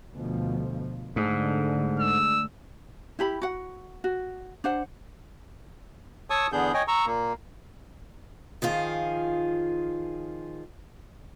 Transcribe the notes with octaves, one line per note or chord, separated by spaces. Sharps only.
D2 B2 F3
G#2 D3 G#3 A3 G#4
E6
E4 G4 B5
F#4 F#5
F#4
D4 C5 F#5
C#5 A5 C#6 D#6 E6
E2 D3 B3 D4 G#4 G6
C#5 D#5 G5 G#5
A#5 C#6 E6
A#2 A#3
D#3 F3 F4 G#4